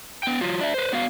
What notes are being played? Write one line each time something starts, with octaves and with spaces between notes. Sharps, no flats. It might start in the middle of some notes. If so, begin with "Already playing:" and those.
B3 G5
F#3 F4
D4 E5
B4 C5
B3 F#4 F5